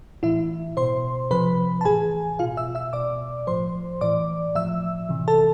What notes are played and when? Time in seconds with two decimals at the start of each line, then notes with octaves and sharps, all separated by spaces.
0.23 A2 E3 E4 E5
0.77 B2 C5 C6
1.31 C3 F3 B4 B5
1.81 A5
1.85 A2 E3 G#4 G#5
2.39 B2 F4 F5
2.57 E5 E6
2.75 E5 E6
2.93 B2 D5 D6
3.47 A2 F3 C5 C6
4.01 A2 E3 D5 D6
4.55 A2 F3 E5 E6
5.09 C3 E3
5.28 A4 A5